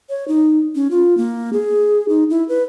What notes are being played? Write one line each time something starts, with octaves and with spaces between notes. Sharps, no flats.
C#5
D#4
C#4
F4
A#3
G#4
D#4
E4
B4